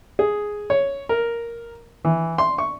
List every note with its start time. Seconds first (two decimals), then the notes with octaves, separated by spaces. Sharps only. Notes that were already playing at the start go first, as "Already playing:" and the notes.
0.19 G#4
0.70 C#5
1.09 A#4
2.05 E3
2.38 C6
2.58 C#6